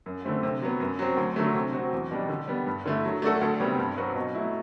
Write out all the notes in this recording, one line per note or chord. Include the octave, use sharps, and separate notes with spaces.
F#2
D3 A3 C4
C3
F#3 B3
F#2
F#3 C4
D2
D3 F#3 A3
C3
F#3 C4 F#4
E2
B2 G3 D4
D3
G3 B3
G2
D3 A3 E4
F#3
A3 D4 F#4 A4
D2
C3 G3 B3
G2
F#3 C4 F#4 B4
B2
F#3 A3 E4